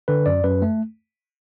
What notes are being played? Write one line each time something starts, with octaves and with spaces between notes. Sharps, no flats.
D3 B4
F#2 D5
F#2 B4
A3